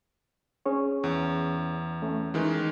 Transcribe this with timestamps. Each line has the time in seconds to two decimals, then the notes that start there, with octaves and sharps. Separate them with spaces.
0.66 C#4 G#4 C#5
1.04 E2
2.02 A3 C#4
2.34 D#3 E3 G#3